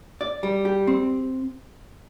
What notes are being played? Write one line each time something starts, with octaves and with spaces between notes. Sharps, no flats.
D5
G3
G4
C4